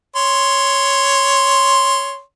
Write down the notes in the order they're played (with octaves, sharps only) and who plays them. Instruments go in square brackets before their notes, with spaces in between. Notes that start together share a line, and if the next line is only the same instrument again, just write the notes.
[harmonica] C#5 C6